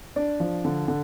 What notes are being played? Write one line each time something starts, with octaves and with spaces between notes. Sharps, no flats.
D4 D5
F3
D3
D3